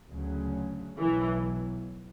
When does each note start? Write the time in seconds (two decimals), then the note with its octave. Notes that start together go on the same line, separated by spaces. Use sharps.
0.10 D2 C#3 F#3
0.98 B1 B2 E3 F#3